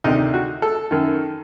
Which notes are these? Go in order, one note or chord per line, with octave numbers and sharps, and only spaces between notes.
D2 C3 D#3 D#4
F#4
A4
F#2 D#3